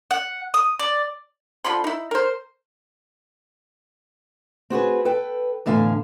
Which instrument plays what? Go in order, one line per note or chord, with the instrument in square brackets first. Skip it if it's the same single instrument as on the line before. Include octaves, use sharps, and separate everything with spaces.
[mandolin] F#5
D#6
D5
[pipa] D3 F3 B5 C6
D#4 E4
A#4 C5
[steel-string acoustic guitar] C4 F#4 G#4 B4
A4 B4 G5
E2 A2 D3 F5 G5 G#5